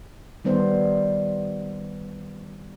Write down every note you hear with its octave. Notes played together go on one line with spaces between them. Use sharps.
D#3 G3 B3 C5